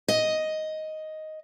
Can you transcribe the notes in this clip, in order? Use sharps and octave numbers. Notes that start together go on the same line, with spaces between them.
D#5